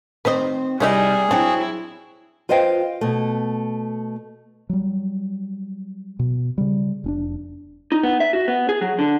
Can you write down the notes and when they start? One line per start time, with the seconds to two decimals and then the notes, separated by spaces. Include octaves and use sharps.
0.25 D#3 C4 B4 C5 D#5
0.80 C3 G3 C#4 D#4 E4 G#4 C#5 E5
1.31 F#3 C4 D4 E4
2.49 F4 B4 C5 D#5 F5 G5
3.01 B2 A3
4.69 F#3 G3
6.19 B2
6.58 C#3 G3
7.04 F1 C#4 D4
7.92 D#4
8.03 B3
8.20 E5
8.33 F#4
8.48 B3
8.69 G#4
8.81 F#3
8.99 D3